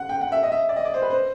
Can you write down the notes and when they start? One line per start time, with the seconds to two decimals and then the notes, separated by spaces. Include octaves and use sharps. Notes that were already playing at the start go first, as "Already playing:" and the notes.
Already playing: F#5
0.09 G5
0.21 F#5
0.32 E5
0.43 D#5
0.52 E5
0.69 D5
0.76 D#5
0.85 D5
0.94 C5
1.02 B4
1.10 C5